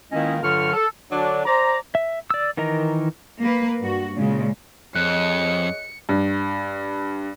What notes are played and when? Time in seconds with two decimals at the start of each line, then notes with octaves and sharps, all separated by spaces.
0.12 C#2 D#3 A#3 C#4 E4 D#5
0.42 G2 D3 F#3 F4 C#6 F6
0.73 A4
1.11 D3 F#3 D4
1.45 C5 D5 A#5
1.95 E5
2.30 D5 E6
2.57 D#3 E3 A#4 D#5 A#5
3.41 A#3 B4
3.80 G2 F#4
4.16 A#2 C#3 G#3
4.95 F2 G#4 C#5 D#5 F#6 C#7
6.09 G2